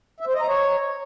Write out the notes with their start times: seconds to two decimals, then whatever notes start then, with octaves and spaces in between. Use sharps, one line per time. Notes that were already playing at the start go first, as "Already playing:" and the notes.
0.20 E5
0.27 C5
0.34 D#5
0.41 A#5
0.48 C#5